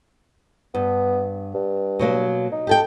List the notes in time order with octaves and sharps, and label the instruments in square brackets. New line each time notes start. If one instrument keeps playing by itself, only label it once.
[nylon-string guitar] G2 [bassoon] B3
[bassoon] G2
[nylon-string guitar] B2 F#3 A#3
[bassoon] D#4
[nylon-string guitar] G4 A4 G5